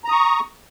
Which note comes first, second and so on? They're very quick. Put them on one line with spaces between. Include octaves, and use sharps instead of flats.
A#5 D#6 C#6